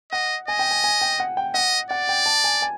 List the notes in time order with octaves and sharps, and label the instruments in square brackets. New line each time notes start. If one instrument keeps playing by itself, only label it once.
[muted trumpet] D#5 [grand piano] F#5
[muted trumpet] D#5 [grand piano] G#5
[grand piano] G5
G#5
G#5
G5
F#5
G5
[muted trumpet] D#5 [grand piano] F#5
[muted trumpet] D5 [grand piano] F#5
[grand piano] G5
A5
G#5
G#5